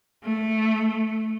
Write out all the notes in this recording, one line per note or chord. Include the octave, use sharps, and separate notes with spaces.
A3